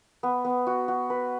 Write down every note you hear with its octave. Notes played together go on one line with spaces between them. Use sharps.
B3
B3
F#4
F#4
B4